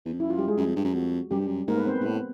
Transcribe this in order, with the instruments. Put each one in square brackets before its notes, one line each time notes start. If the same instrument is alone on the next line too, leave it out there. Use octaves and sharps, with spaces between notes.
[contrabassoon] E2
F2
[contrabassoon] F#2 [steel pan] E4
[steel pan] F4
G3 G4
G#3 G#4
[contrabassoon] F#2
F2
G2
F#2
[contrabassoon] F2 [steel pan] F#4
[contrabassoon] F#2 [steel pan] G3 G4
[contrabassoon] G2
F#2
[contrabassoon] G#2 [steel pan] A#3 A#4
[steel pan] B3 B4
C4 C5
[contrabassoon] G#2 [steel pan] B3 B4
[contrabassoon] A2